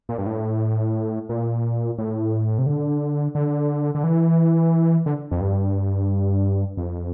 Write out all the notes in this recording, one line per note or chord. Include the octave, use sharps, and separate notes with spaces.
A#2
G2
A2
A#2
A2
C3
D3
D3
D3
E3
D3
F2
G2
F2